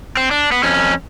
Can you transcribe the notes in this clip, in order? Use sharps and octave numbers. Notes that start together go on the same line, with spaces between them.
C4
D4
B3
F2 C#4